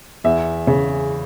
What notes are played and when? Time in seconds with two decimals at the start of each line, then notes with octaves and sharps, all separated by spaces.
0.24 E2 E5
0.67 C#3